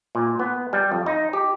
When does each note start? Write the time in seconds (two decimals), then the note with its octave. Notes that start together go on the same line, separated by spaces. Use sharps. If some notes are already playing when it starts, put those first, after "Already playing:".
0.15 A#2
0.39 B3
0.73 G3
0.92 F2
1.06 D#4
1.33 G4